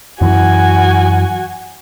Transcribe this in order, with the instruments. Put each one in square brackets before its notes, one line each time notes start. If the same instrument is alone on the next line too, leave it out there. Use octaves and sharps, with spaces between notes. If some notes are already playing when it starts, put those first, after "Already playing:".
[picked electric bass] F#2 E3 [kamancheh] F#4 G#5